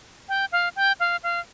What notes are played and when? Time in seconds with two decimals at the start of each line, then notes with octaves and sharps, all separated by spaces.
0.29 G5
0.52 F5
0.76 G5
1.00 F5
1.23 F5